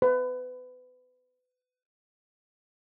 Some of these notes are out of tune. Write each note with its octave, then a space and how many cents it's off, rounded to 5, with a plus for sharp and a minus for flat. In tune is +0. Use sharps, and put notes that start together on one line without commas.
B4 +30